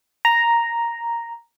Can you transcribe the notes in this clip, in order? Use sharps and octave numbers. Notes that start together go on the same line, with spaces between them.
A#5